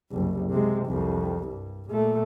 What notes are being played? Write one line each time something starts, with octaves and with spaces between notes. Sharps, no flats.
F#1 C2
C3 G#3
C2 F2
G2
A#2 A3